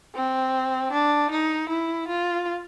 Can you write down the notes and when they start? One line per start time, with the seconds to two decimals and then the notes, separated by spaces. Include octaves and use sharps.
0.15 C4
0.92 D4
1.31 D#4
1.70 E4
2.08 F4